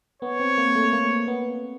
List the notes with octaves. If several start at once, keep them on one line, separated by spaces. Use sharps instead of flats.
B3 C#5
C4
A#3
A3
A#3
B3